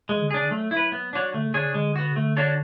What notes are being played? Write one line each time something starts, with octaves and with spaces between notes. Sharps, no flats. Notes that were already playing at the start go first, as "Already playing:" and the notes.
E3 G#3
D3
C#3 D4 G#4
D3
F#3 A3
E4
B4
B3
D4 F#4 C#5
D3 A3
C#3
D3 D4 G#4 C#5
C#3
D3 G#3
B3 F#4
C#3
D3 A3
D4 F#4 A4 C#5